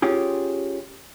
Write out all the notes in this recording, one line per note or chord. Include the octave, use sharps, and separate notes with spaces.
C#4 F4 G4 G#4